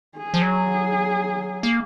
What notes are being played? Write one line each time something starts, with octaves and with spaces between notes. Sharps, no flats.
G#4
F3
F#3
A#3